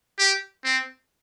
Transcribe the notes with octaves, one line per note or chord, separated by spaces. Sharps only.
G4
C4